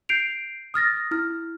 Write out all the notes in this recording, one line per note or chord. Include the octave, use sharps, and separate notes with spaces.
G6 C7 D7 F7
D#6 F6 A6 A#6
E4 F6